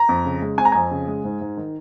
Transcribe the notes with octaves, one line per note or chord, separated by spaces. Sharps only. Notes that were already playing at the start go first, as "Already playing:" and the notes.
Already playing: A#5
F2
C#3
G#3
C4 G#5
A#5
F2 G#5
C#3
G#3
G#2
G#2
D#3